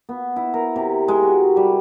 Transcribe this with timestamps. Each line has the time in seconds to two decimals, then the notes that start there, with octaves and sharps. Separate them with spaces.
0.09 B3
0.36 E4
0.54 A#4
0.76 C3
1.08 G#3
1.22 F#4
1.57 G3